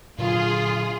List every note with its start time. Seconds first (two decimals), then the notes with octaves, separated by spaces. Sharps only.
0.18 A#2 D3 F#3 F4 G#4